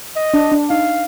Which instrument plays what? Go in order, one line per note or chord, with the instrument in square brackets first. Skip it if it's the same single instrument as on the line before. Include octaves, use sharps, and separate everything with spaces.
[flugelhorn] D#5
[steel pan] D4
D4
[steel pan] D#4 [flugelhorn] F5